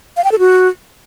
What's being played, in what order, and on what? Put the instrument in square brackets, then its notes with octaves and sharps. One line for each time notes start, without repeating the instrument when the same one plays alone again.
[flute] F5
G5
A4
F#4